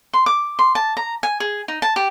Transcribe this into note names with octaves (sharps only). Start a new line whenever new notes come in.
C6
D6
C6
A5
A#5
G#5
G#4
D#4
A5
G4